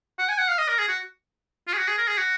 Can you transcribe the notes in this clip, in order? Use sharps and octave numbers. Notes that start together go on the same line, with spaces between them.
F#5
G#5
F#5
F5
D#5
A#4
G#4
F#4
F4
G#4
F#4
G#4
A#4
G#4
F#4